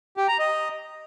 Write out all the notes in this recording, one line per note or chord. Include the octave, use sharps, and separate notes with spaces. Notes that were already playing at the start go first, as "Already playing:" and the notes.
G4
A#5
D#5